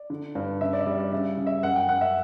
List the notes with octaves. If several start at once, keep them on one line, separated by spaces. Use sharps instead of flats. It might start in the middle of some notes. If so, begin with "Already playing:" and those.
Already playing: D5
D3
G2
C#3 E5
D5
E5
G3 D5
D5
C#3 E5
C#3
E5
F#2 F#5
G5
F#2 F#5
E5